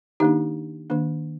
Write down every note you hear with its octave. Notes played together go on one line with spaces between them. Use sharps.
D#3 A#3 D4 D#4 G4
D#3 A#3 D4